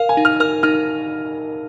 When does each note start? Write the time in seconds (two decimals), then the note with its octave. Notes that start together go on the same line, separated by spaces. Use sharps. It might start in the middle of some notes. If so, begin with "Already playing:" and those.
Already playing: A#4 F5
0.09 G#5
0.17 D#4
0.25 F6
0.40 A#4 F6
0.63 D#4 F6